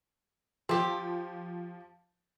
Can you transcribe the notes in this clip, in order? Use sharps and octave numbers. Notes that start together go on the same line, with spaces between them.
F3 C4 G4